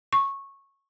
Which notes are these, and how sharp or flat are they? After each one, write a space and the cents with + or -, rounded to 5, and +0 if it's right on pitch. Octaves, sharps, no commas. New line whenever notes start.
C#6 -15